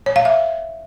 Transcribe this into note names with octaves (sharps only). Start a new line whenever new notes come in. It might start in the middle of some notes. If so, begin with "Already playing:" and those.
C#5
F5
E5